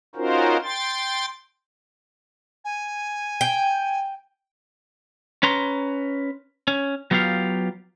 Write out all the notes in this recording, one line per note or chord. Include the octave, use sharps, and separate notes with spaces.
C#4 D#4 F4 F#4 A#4 C5
G5 C6 A6
G#5
G5
C#4 B4 A#5 C6
C#4
F#3 B3 F4 G4 F5